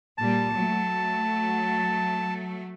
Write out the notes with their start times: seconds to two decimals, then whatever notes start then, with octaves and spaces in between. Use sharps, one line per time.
0.18 A#2 G3 A5
0.53 F#3 A3